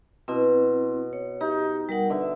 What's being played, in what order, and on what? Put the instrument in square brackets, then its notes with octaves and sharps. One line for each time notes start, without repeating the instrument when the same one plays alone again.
[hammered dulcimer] B2 [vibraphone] C4 E4
[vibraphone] C#5
[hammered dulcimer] D#4 [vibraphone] G4
[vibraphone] G3 A#4 F#5
[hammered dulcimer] D3 E5 [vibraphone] B4